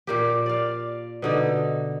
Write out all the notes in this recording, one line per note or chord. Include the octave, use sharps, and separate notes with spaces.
A#2 A#3 G4
D5 F5
B2 D3 D#4